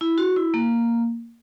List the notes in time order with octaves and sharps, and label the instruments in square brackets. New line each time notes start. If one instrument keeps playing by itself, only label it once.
[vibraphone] E4
F#4
E4
A#3